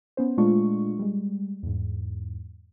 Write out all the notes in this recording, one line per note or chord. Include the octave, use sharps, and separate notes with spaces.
B3 C#4 C5
A#2 G#3 A3 D4 F4 C#6
G3 G#3
E2 G#2